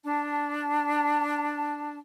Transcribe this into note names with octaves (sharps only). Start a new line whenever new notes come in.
D4 A5